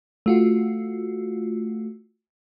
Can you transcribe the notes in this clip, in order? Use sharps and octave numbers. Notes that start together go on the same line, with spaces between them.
A3 F4 F#4